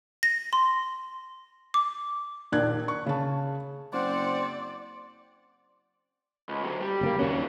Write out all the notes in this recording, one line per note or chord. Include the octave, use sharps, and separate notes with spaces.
A#6
C6
D6
A#1 D#2 D4 D5 F#6 G#6
C#6
C#3 A5
F#1 C4 C5 D5 F#5 C6
C#2
D2 F#3
G3
F#1 C#3 A#3
D#2 F#3 A#3 C#4 D4